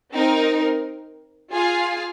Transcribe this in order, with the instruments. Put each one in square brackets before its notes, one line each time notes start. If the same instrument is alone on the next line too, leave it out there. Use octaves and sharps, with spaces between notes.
[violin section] C4 D#4 A#4
F4 G#4 F5 G#5